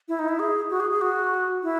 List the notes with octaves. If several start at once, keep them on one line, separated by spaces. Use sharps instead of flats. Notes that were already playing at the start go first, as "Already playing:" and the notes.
E4
D#4
E4
G#4
F#4
G#4
G#4
F#4
E4